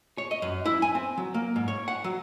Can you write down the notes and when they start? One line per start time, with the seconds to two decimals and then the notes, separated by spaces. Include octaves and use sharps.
0.18 C#5
0.31 D#5
0.42 F#2
0.66 E4
0.82 G#5
0.95 C4
1.18 F#3
1.34 A#3
1.56 G#2
1.68 C#5
1.88 F#5
2.04 F#3